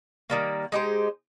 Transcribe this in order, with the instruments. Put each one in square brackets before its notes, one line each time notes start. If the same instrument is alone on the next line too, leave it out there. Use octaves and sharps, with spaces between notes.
[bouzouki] D#3 G3 A#3
G#3 D#4 G4 C5